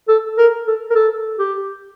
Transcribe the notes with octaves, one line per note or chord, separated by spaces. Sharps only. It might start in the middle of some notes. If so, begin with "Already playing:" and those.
A4
A#4
A4
A#4
A4
G4